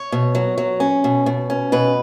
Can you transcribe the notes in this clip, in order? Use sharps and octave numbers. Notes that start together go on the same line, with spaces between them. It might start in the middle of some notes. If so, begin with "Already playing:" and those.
Already playing: C#5
B2
F#3
F#3
C#4
B2
B2
C#4
B2 B4